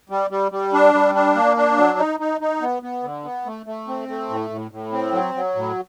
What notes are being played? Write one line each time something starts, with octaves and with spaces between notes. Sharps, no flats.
G3
G3
G3
D4
G3
D4
A#3
D4
F#3
D#4
D#4
D#4
B3
B3
D3
B3
A3
A3
C4
A3
A2
A2
A2
C4
F#3
F#3
A2